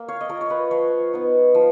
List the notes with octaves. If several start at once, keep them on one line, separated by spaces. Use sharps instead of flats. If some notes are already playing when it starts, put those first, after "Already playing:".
Already playing: A#3
C#5 F5
D#5
F4 A#4 C#5
C#5
B4 D#5
F3 C#5 F5
B3 D#4
F3